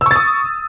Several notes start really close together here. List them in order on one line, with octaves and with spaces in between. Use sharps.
E6 C#6 A6 D#6